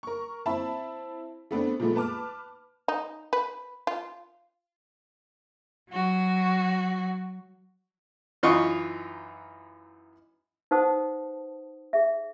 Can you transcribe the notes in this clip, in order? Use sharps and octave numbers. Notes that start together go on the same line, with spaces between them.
A#4 C#6
C4 E4 E5 A5 B5
A3 B3 C4 D4
A#2 F3 G#3 A3 B3
B4 A5 D6 F6
D#4
B4
F4
F#3 F#4
F#2 E3 D#4 F4 D#5 C#6
D#4 B4 C5 F#5 A5 D#6
G#4 E5